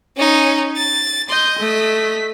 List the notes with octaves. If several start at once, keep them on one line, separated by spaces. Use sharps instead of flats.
C#4 D#4
A6
D#5 C6 G6
A3 B6